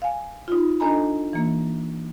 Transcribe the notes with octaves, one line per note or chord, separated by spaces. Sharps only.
F5 G#5
D#4 F4
D4 A4 D#5 G#5 A#5 B5
E3 A#3